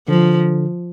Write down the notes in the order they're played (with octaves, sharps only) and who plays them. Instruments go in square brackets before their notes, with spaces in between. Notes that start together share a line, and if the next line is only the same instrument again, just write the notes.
[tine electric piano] D3 [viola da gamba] F3